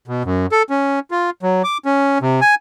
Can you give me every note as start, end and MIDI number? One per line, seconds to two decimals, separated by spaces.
0.08 0.23 47
0.25 0.46 42
0.52 0.63 69
0.70 0.99 61
1.11 1.30 65
1.43 1.62 54
1.64 1.78 86
1.85 2.18 61
2.22 2.40 48
2.41 2.55 80